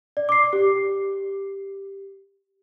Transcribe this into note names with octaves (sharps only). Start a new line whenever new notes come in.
D5
D6 C7
G4